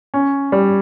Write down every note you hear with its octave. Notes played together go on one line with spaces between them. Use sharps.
C#4
G3